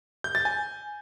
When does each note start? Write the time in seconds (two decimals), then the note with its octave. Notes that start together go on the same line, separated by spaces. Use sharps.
0.24 G6
0.35 A6
0.45 G#5